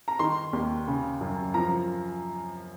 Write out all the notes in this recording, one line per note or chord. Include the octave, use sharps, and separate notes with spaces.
A#5
D#3 C6
D#2
C#3
F#2
F3 A#5